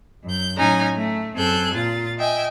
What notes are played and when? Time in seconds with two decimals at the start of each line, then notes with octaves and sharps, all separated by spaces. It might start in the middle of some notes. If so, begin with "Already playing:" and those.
0.24 F#2 G6
0.57 A2 F#3 C#4 D#4 G#5 A#5
0.96 A3
1.36 F#2 C4 A4 G#5 F#6 G6
1.74 A#2 F4 A6
2.18 D#5 E5 G5 G#5